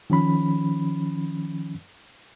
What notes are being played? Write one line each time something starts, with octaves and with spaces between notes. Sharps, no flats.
D#3 F3 C#4 B5